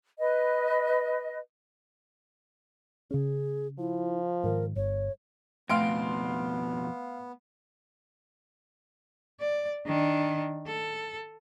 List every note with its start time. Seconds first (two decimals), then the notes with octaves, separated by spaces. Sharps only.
0.18 B4 D#5
3.11 C#3 C#4 G#4
3.79 F3 E4
4.44 G#2 D#3 A#4
4.76 G1 C#5
5.70 F2 B2 A3 B3 F5 C6 D7
9.40 D5
9.86 D#3 D4
10.67 A4